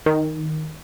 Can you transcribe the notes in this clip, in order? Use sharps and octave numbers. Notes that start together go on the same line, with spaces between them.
D#3